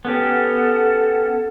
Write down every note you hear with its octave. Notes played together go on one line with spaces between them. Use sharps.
B3 C#4 G4 A4 F#5